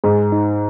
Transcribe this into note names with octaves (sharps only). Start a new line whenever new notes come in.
G#2 G#4
D#4